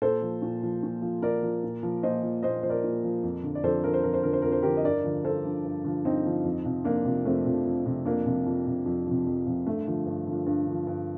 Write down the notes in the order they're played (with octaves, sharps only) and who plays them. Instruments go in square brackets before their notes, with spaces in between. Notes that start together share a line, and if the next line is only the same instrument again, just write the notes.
[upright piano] A#2 A4 C5
F3
A#2
F3
A#2
F3
A#2 A#4 D5
F3
A#2
F3
A#2 C5 D#5
F3
A#2 C5 D#5
F3 C5
A#4 D5
A#2
F3
F2
D3 F3
D5
F2 A4 C5
D3 F3 A#4
C5
F2 A#4
C5
D3 F3 A#4
C5
F2 A#4
C5
D3 F3 G4 A#4
D#5
G2 A#4 D5
D3 F3
G2 A4 C5
D3 F3
G2
D3 F3
G2 C4 D#4
D3 F3
F2
C3 F3
F2 A#3 D4
C3 F3
F2 A3 C4
C3 F3
F2
C3 F3
F2 A#3 D4
C3 F3
F2
C3 F3
F2
C3 F3
F2
C3 F3
G2 A3
D3 F3
G2
D3 F3
G2
D3
F3
G2